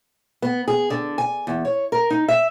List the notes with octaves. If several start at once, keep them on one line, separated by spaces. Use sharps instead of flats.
B3
G#4
D3
G#5
E2
C#5
A#4
D#4
E5